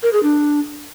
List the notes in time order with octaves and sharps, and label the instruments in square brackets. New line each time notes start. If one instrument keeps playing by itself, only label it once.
[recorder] A#4
G#4
D4